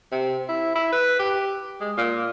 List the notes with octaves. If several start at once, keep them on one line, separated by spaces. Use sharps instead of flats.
C3
E4
E4
B4
G4
G#3
A#2